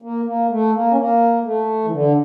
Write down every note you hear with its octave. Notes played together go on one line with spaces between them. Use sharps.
A#3
A#3
A3
A#3
C#4
A#3
A3
E3
D3